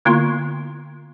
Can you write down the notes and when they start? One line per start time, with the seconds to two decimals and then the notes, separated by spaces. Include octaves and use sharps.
0.05 D3 A#3 B3 E4 F4 C6